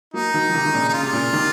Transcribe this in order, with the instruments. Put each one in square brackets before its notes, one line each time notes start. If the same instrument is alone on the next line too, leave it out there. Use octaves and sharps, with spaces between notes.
[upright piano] F#3 A#3 [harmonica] D#4
[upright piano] D#3 F#3
F3
C3 D#3
D#3
A#2 C#3
[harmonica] D#4
[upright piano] C#3 [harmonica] F4
[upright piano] C3
A#2 C#3
C3 D#3